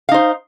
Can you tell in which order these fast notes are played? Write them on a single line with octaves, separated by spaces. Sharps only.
F5 D#4 C5